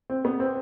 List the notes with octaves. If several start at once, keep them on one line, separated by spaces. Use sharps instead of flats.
C4
B3
C4